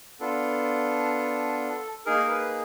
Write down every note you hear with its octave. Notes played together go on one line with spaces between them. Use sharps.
B3 D4 F4 A4
A#3 D#4 G#4 A#4
B4